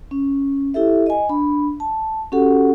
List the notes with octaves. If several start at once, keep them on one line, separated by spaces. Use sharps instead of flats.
C#4
E4 G4 A4 E5
D#5 G#5
D4 B5
A5
C#4 F#4 G4 A4 F#5